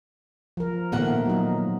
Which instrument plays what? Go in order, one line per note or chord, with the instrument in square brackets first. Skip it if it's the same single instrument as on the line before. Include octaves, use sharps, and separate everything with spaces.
[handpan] F3 A#4
[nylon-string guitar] A#2 A#4 F#5 [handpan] D#3 A3 B3
[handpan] F#3 D#4